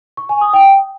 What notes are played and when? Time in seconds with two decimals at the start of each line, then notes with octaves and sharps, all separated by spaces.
0.17 C#6
0.29 G#5
0.41 D#6
0.53 G5